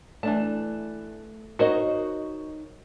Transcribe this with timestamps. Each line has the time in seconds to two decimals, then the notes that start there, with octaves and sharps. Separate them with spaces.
0.23 E3 A3 D4 A5
1.59 D#4 F#4 A#4 C5 C#5 D#5